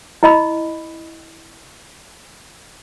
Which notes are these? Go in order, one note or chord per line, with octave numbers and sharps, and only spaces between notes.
E4 D#5 B5